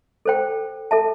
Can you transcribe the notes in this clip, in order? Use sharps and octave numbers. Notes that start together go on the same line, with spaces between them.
A4 C5 G5
A4 E5 A5